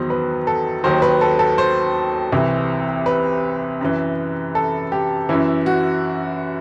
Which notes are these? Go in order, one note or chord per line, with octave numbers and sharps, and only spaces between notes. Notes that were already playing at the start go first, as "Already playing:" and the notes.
Already playing: E2 D#3 F#3 C5
B4
A4
D#2 D#3 F#3 C5
B4
A4
A4
C5
C2 C3 E3
B4
F#2 E3
A4
G4
F#2 E3 E4
F#4